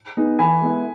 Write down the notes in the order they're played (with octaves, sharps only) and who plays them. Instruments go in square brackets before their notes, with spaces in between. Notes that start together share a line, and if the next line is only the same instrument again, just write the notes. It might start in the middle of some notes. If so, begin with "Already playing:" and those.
[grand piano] B3 D#4 G#4
[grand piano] E3 [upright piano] G#5 B5
[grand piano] G#3 B3 E4